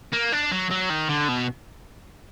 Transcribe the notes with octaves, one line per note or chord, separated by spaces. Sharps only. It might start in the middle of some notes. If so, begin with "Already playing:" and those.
A#3
D4
F#3
F#3
D#3
D3
B2